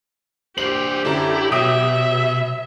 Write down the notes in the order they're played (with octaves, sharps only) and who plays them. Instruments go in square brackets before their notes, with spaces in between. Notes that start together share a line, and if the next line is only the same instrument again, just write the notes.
[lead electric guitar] D4 C5 [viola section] G4 [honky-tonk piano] C7 F#7
[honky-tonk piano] F#2 D3 [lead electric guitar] E4
[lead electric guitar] B2 [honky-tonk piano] F#3 D#6 D7 [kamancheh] E5